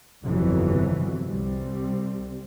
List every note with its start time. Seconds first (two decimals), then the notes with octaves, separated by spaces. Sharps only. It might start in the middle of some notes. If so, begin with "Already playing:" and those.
0.24 G1 C2 F2 C3 E3 F#3
1.24 C2 G3 C4